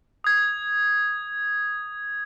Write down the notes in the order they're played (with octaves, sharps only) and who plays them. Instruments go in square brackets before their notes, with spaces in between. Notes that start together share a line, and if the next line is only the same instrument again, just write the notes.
[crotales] D#6 G#6